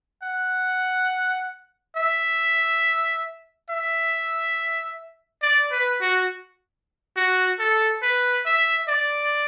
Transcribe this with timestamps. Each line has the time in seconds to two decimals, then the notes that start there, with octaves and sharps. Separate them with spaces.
0.23 F#5
1.96 E5
3.70 E5
5.42 D5
5.72 B4
6.01 F#4
7.16 F#4
7.59 A4
8.03 B4
8.46 E5
8.89 D5